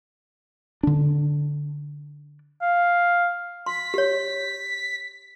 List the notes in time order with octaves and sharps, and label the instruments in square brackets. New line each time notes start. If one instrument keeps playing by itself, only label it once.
[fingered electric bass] D3 D4
[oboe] F5
[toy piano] C6 [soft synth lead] B6
[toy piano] G4 C#5